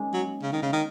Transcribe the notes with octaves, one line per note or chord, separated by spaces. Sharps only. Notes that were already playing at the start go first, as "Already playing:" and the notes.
Already playing: G#3 A#3 C#4 D#4
F#3
C#3
D#3
C#3
D#3